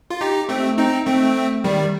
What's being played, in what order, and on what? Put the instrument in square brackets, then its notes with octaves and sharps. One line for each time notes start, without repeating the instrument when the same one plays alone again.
[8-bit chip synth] F4
D#4 G4
A3 C4
C4 D#4
A3 C4
D#3 G3